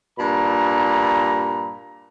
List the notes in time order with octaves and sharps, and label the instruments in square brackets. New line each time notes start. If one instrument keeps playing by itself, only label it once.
[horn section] G2 A#2 A#5 B5